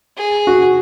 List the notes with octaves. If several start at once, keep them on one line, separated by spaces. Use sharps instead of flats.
G#4
F#4